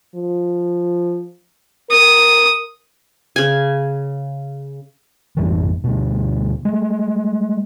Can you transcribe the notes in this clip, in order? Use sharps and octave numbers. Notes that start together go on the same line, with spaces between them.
F3
A#4 D#6
C#3 G#5
A1 F2 G#2 E3
D2 B2
G#3 A3